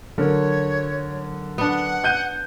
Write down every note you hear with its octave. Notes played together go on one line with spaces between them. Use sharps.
D3 F#3 A#4 C#5
B3 D4 F#5
F#6 G6 D#7